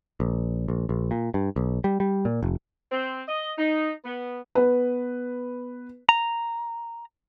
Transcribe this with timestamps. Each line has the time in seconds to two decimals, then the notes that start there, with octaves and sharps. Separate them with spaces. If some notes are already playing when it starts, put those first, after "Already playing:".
0.20 A#1
0.68 A#1
0.89 A#1
1.11 A#2
1.34 G2
1.56 B1
1.84 G3
2.00 G3
2.25 A#2
2.43 F1
2.92 C4
3.27 D#5
3.58 D#4
4.05 B3
4.55 B3 B4
6.09 A#5